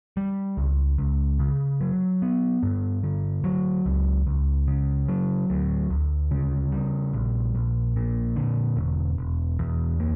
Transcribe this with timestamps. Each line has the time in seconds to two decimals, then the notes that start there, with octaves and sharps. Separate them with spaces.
0.17 G3
0.57 C#2
0.98 C#2
1.39 C#3
1.81 F#3
2.22 B3
2.63 G2
3.03 D3
3.44 F#3
3.86 C#2
4.27 C#2
4.67 C#3
5.08 F#3
5.50 D2
5.90 D2
6.31 C#3
6.72 G3
7.13 A#1
7.54 A#1
7.96 A#2
8.36 D3
8.77 E1
9.18 E1
9.59 E2
10.00 A#3